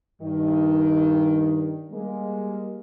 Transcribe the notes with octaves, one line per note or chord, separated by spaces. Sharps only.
G2 D#3
G3 G#3 A#3